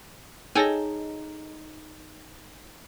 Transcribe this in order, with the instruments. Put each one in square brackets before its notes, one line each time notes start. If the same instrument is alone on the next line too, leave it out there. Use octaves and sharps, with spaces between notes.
[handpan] D#4 [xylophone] G#4 C#5 A#6 [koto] A4 G5 G#5